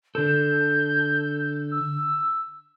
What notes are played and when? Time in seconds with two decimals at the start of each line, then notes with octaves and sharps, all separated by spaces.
0.15 D3 A4 G6
1.72 E6